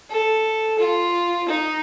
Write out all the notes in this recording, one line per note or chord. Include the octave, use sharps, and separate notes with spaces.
A4
F4
D#4